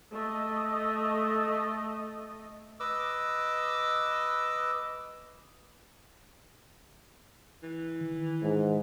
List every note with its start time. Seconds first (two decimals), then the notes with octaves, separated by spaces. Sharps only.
0.12 A3 D#5
2.80 B4 D#5 D6 E6
7.63 E3
8.01 D#3
8.43 G#2